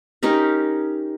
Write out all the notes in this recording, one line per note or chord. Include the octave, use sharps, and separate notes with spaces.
C#4 D#4 G4 A#4